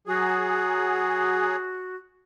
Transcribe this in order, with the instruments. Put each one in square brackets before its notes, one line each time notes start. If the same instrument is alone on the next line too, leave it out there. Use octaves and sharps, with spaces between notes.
[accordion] F#3 G#4 [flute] F#4